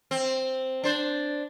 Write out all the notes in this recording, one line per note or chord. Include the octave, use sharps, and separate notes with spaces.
C4
D4 C5